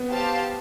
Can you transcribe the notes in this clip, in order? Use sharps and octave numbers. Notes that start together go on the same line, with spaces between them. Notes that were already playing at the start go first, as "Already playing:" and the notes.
Already playing: B3
G4 C5 F5 A5